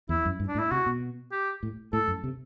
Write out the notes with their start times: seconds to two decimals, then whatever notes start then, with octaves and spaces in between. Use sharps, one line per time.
0.09 E2 E4
0.26 F#2
0.40 G2
0.48 D4
0.55 A2
0.59 E4
0.71 C3 F#4
0.86 B2
1.32 G4
1.63 A2
1.93 A2 A4
2.08 F#2
2.24 C3